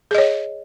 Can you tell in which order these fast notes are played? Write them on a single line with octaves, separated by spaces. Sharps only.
G#4 D#5 C#5